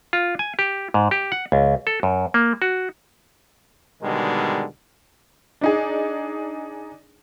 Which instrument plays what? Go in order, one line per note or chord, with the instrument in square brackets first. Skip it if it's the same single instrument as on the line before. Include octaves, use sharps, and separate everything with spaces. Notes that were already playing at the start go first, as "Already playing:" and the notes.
[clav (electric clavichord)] F4
G#5
G4
G#2
G4
F#5
C#2
A4
F#2
A#3
F#4
[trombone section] G#2 B2 D3 D#3 G3 G#3
[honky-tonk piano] D4 D#4 G#4